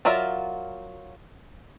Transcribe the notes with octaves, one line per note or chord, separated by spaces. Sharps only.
F#3 F4 A#4 D5 E5